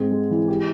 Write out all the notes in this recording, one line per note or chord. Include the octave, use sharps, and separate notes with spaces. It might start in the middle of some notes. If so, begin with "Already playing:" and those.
Already playing: G#2 C4 G#4
G#3
E3
G4